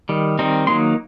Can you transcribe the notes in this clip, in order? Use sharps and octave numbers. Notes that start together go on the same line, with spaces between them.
D#3 G3
D#3 G3 C4 D#4
D#3 F#3 A#3 D#4 C6